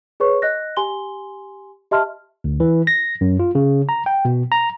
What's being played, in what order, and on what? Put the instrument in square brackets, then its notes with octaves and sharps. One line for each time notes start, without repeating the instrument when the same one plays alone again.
[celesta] G#4 B4 C#5 C#6
D#5 F#6 A#6
G4 G#5 C6 G7
G4 D#5 E5 A5 C6 F6
[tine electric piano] D2
E3
A#6
F#2
F4
C#3
A#5
G5
B2
A#5